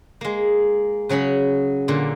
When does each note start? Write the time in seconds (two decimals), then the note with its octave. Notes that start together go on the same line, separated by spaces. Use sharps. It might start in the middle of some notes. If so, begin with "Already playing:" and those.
0.21 G#3 A#3
1.09 C#3 F#3 C#4 G#4 B5
1.88 A#2 D3 A#3